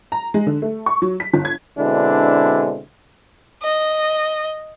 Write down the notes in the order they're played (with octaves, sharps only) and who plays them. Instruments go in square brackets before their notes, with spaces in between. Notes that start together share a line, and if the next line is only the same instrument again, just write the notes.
[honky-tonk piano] A#5
G#3
D3
A3
C#6
F#3
B6
G1
G#6
[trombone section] B2 D3 G#3 C4 D4 E4
[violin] D#5